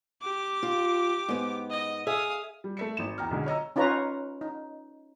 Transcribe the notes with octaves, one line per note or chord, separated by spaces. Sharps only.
G4 D6
F4
G#2 B3
D#5
G#4 E5 F5 D#6
G3
A3 E5 C#7
G#1 E7
E2 G5 A#5 F6
B1 D3 G#3
C#5 D#5 A#5 E6
C#4 D#4 F4 B4 C#5 A#5
D#4